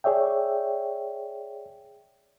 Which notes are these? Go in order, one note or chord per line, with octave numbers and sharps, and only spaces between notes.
G#4 C#5 D5 E5 G5